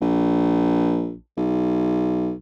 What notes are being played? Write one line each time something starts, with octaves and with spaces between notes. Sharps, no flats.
A#1
B1